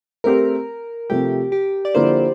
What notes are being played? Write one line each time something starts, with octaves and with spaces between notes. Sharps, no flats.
A3 C4 G4 A#4 C5
C3 F3 A3 G4
G4
D5
D3 F3 A#3 E4 C5